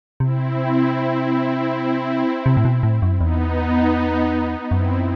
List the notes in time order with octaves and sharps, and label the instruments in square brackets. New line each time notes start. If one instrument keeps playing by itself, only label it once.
[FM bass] C3 [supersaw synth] C4 E4
[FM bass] C3
A2
B2
A2
F#2
[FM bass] E2 [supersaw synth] B3 D#4
[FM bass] F#2 [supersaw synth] C4 E4